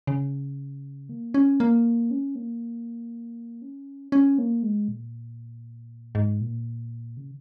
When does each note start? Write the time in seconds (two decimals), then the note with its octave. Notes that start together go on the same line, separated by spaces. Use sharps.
0.07 C#3
1.09 A#3
1.34 C#4
1.60 A#3
2.11 C#4
2.35 A#3
3.62 C#4
4.12 C#4
4.38 A#3
4.63 G#3
4.88 A#2
6.15 G#2
6.41 A#2
7.17 C#3